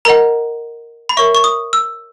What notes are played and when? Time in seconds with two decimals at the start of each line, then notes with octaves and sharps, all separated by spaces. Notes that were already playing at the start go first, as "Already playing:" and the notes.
0.05 A#4 D#5 F#5 A#5
1.09 B5
1.17 A#4 C#5 E5 C#6
1.35 C#6
1.44 D#6
1.73 E6